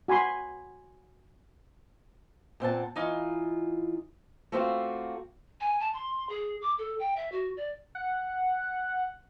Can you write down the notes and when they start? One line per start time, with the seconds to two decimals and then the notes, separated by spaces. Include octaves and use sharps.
0.08 F#4 G#5 B5 C6
2.60 A#2 C4 F#5 A5
2.95 E3 D#4 F4
4.52 A3 A#3 C4 F4 F#4
5.60 G#5
5.80 A5
5.94 C6
6.29 G#4
6.62 D6
6.78 A4
7.00 G5
7.16 E5
7.32 F#4
7.57 D5
7.95 F#5